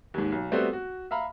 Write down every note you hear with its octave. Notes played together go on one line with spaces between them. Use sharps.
D#2 G#2
B1
G3 A3 B3 C4 F#4
F#4
E5 F5 A#5 B5